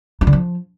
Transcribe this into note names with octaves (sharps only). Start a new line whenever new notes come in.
D#4
D3
F3